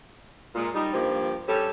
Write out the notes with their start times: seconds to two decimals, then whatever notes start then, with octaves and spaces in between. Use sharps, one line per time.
0.55 A#2 G#3
0.74 G3 D#4
0.94 G2 F3 A#3 G4
1.48 G3 C#4 G4 A4